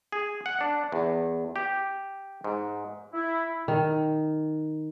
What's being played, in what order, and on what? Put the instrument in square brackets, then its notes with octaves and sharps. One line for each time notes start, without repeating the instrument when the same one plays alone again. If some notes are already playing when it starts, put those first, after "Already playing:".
[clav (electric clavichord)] G#4
F#5
D4
E2
G4
G#2
[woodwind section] E4
[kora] D#3